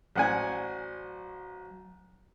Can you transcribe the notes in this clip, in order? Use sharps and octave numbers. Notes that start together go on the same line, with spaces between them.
A1 F#3 C5 D5 F#5 G#5